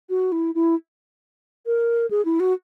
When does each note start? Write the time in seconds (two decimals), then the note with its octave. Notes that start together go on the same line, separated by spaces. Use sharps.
0.10 F#4
0.32 E4
0.55 E4
1.66 A#4
2.11 G#4
2.25 E4
2.40 F#4